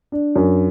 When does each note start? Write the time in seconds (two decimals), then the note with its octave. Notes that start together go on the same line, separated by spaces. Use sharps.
0.12 D4
0.36 F#2